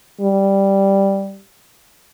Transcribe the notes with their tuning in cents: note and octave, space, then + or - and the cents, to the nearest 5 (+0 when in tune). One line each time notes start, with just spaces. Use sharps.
G3 +0